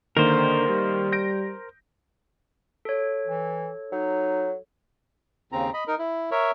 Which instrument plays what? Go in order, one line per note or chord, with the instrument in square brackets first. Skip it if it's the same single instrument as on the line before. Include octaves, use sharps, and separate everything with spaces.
[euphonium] D3 [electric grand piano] D#3 A#3 [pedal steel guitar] A#4 C5
[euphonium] G3
[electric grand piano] G6 A#6 D7
[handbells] A4 C#5
[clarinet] E3
[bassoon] F#3 [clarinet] D#4
[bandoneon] D#2 C#3 C4 A#5
D#5 B5
D#4 A#4
E4
A#4 C#5 E5